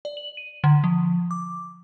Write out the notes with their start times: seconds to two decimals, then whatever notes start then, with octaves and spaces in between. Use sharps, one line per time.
0.05 D5
0.17 F#7
0.37 D#7
0.64 D3
0.84 F3
1.31 D6